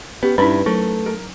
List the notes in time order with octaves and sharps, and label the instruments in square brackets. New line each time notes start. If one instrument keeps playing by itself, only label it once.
[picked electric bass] B3 [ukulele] C#4 G4
[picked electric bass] G2 [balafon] C#4 D#4 E4 [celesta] B4 [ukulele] E5 B5
[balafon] F#3 [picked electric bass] A3 [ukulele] A#4
[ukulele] A#4